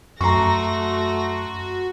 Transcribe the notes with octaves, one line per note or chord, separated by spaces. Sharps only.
F#2 A3 F#4 A#5 C6 C#6 A#6